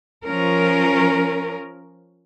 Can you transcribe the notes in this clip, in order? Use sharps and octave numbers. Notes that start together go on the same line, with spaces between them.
F3 C#4 A#4